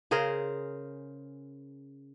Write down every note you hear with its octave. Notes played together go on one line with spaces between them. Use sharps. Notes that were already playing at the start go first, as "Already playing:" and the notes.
C#3 G#4 A#4 C5